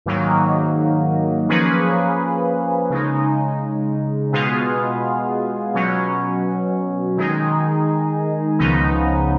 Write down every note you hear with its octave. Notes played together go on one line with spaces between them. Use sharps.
G#2 D#3 F#3 A#3 D#4
F3 A#3 C#4 G#4 B4
C#3 G#3 D#4
B2 G#3 B3 F4 G#4
B2 F#3 C#4
D#3 G#3 D#4 G#4
C#2 C#3 F3 B3 D#4